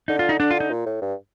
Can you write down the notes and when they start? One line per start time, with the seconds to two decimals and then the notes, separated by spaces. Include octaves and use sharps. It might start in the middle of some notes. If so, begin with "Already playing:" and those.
0.08 D3 D#4
0.19 F4
0.29 D#4
0.39 D3 D4
0.51 F4
0.60 D#4
0.70 A#2
0.86 A2
1.02 G2